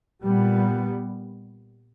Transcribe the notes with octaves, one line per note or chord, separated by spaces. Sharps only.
A#2 G3 B3